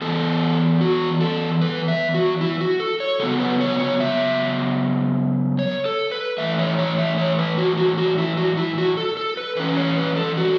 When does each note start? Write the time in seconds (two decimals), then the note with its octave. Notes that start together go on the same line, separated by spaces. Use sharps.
0.02 E3 B3 A4
0.81 F#4
1.21 A4
1.61 B4
1.88 E5
2.14 F#4
2.41 E4
2.61 F#4
2.80 A4
3.00 C#5
3.20 C#3 F#3 B3 A4
3.40 B4
3.61 C#5
3.79 C#5
4.00 E5
5.59 C#5
5.85 A4
6.11 B4
6.38 A2 E3 A3 E5
6.59 C#5
6.79 C#5
6.99 E5
7.18 C#5
7.38 B4
7.58 F#4
7.77 F#4
7.98 F#4
8.18 E4
8.37 F#4
8.57 E4
8.78 F#4
8.97 A4
9.17 A4
9.37 B4
9.57 E3 C#4 B4
9.77 C#5
9.97 B4
10.16 A4
10.37 F#4